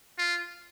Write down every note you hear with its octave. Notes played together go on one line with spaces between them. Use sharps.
F4